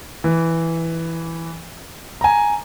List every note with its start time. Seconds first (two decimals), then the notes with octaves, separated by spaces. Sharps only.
0.24 E3
2.21 G#5 A#5